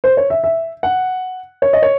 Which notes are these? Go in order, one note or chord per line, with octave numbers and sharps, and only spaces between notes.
C5
C#5
E5
E5
F#5
C#5
D#5
C#5